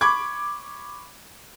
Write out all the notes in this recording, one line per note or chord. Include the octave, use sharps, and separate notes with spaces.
B5 C#6 D6 G#6